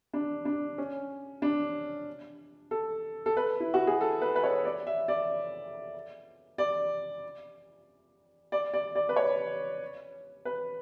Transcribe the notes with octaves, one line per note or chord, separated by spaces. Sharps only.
D4
D4
C#4
D4
A4
A4
B4
E4
F#4
G#4
A4
B4
B4
C#5
D5
E5
D5
D5
D5
D5
D5
B4
C#5
B4